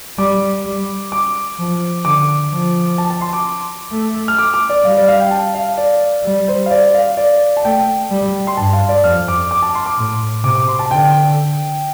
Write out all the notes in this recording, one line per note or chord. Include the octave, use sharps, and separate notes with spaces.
G3 D6
G3
D6
F3
D3 D6
F3
A5
A5
C6
D6
A3
F6
D6
D6
D5
G3 F5
D5
F5
G5
A5
F5
D5
G3
C5
F5
D5
F5
D5
A5
A3 G5
G3
C6
G2 A5
F5
D5
F2 F6
D6
D6
A5
C6
D6
A2
C3 D6
D6
C6
A5
D3 G5